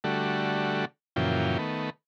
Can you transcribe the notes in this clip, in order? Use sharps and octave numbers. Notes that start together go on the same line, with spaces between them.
D3 G3 A3 F#4
F#2 A#2 C#3 E3 F3 G5
D#3 A3 B3